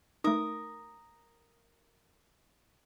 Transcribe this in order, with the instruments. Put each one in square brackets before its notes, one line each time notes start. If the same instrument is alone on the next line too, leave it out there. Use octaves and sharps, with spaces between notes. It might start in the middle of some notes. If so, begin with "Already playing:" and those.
[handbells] A3 D#4 [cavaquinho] A#4 D#6